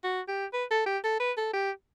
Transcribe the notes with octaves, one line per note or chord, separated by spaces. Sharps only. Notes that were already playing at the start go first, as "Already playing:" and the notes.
F#4
G4
B4
A4
G4
A4
B4
A4
G4